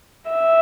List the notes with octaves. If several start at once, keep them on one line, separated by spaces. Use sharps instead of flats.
E5